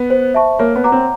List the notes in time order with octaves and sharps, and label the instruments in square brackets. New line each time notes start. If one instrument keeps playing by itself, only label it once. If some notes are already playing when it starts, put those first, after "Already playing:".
Already playing: [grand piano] B3
[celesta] C5
E5 A5 C#6
[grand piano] A#3 [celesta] C#5
[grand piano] B3
[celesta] F#5 A#5 D6
[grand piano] C4